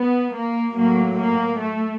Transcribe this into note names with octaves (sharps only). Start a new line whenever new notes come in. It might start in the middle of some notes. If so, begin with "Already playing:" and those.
Already playing: B3
A#3
A2 F#3 A#3
A#3
A3